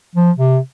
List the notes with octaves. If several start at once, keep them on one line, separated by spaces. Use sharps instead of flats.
F3
C3